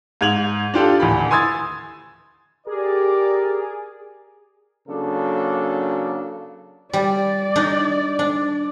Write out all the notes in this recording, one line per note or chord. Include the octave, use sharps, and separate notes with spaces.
G#2 G#6 F7 F#7
D4 F4 G4 A4
D#1 D2 E3 B5
G#5 C6 D#6 E6 G#6 A6
G4 G#4 A#4 D5
C#3 F#3 A#3 D4 A4
G3 D5
D4 D#4
D4